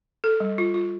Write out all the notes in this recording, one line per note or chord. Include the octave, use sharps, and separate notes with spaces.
A4
G3
F4
F4